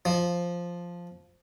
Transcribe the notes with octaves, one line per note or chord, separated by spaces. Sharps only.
F3